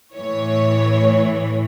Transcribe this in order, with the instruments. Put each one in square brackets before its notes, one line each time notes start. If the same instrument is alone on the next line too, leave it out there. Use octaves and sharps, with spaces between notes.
[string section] A2 E3 C#5